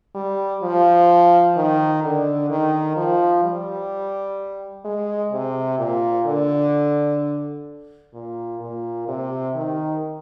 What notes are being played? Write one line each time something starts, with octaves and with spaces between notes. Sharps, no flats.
G3
F3
D#3
D3
D#3
F3
G3
G#3
C3
A#2
D3
A#2
A#2
C3
D#3